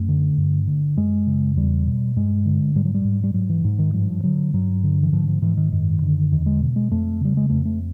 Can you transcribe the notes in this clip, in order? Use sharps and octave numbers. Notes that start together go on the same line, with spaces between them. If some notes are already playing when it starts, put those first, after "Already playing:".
Already playing: F#2 A3
D3
G2
D3
F#2 G#3
C#3
E2 G3
B2
G2 G#3
D3
G#2 G3
F#3
G3
G#2
G3
G#2 F#3
E3
G#2
D#3
G2 F3
D3 F#3
G2 F#3
D3
E3
G#2 F3
F3
G#2 E3
D#3
F#2 D#3
D3
E2 D#3
G#3
B2
G#3
F2 A3
C#3 G3
G#3
F2 A3
A3